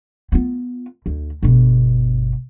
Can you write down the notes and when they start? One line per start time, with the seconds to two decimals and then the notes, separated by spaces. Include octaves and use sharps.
0.32 B3 F4
1.06 D2
1.43 G1 B2